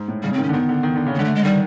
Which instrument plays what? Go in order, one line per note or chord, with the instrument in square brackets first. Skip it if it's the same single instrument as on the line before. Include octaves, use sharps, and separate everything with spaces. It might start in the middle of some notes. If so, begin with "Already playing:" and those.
Already playing: [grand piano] G#2
A2
[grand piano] C#3 [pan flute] G3
[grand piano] D#3 [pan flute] C4
[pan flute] C#4
[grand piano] D3
[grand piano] D#3 [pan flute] B3
[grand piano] D3
D#3
D3
C#3
[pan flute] B3
[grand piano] D3 [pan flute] G#3
[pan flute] A3
G#3
[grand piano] D#3 [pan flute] G3